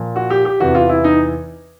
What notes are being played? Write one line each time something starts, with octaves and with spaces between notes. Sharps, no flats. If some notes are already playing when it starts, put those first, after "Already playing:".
Already playing: A#2 F3
F#4
G4
G4
E2 C3 E3 F#4
F4
E4
D#4